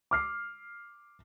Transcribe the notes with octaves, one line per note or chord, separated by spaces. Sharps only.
D6 F6 C7